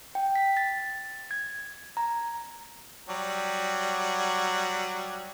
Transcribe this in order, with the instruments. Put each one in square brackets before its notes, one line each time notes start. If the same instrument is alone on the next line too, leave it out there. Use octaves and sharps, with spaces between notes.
[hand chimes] G5
B6
A6
G#6
A#5
[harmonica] F#3 G3